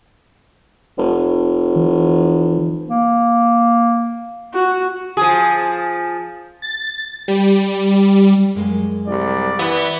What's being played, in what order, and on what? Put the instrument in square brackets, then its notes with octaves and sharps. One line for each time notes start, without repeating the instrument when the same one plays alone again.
[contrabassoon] F1
[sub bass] E3
[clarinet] A#3
[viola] F#4
[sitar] F3 G#4
[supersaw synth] A6
G3
[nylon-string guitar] F#2 G#3 A#3
[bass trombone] C2 [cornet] D5
[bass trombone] E3 [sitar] B3